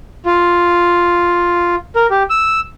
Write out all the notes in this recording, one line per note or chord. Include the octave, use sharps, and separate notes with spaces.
F4
A#4
G4
E6